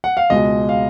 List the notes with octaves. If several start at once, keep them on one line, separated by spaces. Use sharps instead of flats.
F#5
F5
C#2 B2 G#3 D#5
F5